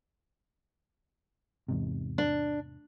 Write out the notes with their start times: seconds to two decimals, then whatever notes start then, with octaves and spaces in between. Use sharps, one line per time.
1.68 E2 G#2 C3
2.18 D4